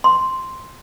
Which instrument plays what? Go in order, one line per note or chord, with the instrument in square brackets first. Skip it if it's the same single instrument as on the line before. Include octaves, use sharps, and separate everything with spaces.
[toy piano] C6